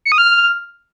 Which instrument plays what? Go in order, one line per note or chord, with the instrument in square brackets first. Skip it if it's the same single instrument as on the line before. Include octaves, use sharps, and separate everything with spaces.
[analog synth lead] C#7
D#6
F6